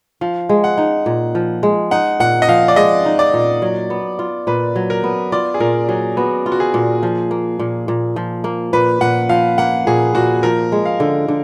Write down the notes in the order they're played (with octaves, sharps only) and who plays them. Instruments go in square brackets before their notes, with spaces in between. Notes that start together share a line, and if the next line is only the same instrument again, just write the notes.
[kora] F3 [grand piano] F5
[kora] G#3
[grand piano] F#5
[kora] D#4
A#2
F3
G#3
[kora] D#4 [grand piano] F#5
[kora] A#2 [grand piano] F#5
[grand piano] D#5
[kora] F3 [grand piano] F5
[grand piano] D5
[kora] G#3 [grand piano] D#5
[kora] D#4
[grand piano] D5
[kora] A#2
F#3
B3
F4
[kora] A#2 [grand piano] B4
[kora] F#3
[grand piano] A#4
[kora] B3
[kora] F4 [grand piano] D5
[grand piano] G#4
[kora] A#2 [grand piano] A#4
[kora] F#3 [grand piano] G#4
[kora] B3 [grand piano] F#4
[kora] F4
[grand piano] F#4
G#4
[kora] A#2
F3
A#3
A#2
A#2
F3
A#3
[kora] A#2 [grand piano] B4
[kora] A#2 [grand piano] F#5
[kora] F3 [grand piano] F5
[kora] A#3 [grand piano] F#5
[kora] A#2 [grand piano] G#4
[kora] A#2 [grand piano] F#4
[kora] F3 [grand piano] A#4
[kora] G#3
[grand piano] F5
[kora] D3
D3